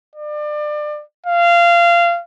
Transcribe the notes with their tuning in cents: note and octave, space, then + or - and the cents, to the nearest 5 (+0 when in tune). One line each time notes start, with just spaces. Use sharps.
D5 +30
F5 -20